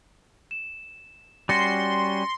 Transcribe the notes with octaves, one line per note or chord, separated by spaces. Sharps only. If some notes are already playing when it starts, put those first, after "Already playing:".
E7
G3 C#4 F#4 C6 A6 A#6 C#7